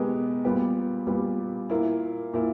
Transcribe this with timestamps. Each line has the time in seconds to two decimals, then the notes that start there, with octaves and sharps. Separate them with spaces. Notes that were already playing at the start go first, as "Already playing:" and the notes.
Already playing: B2 G#3 B3 G4 A#4
0.45 A#2 G3 B3 G4
1.07 A#2 G3 B3 G4
1.69 A#2 A#3 E4
2.34 A#2 A#3 E4